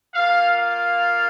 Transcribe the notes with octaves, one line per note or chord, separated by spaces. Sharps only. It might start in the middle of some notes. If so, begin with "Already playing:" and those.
A#3 F4 F5
F5